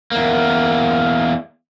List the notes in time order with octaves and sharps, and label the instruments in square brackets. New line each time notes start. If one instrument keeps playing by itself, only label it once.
[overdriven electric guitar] E2 A#3